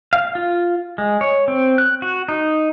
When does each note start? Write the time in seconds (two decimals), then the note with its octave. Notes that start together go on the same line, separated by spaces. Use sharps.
0.13 F5
0.35 F4
0.98 G#3
1.21 C#5
1.48 C4
1.78 F#6
2.02 F#4
2.29 D#4